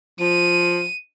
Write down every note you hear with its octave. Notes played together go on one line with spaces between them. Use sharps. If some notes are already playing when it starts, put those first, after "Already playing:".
F3 D#7